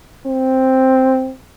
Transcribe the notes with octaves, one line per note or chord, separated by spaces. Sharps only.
C4